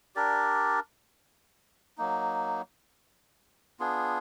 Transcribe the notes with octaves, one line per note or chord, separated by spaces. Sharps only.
D4 G4 A#4 D5
F#3 A#3 D#4
B3 D4 F4 G#4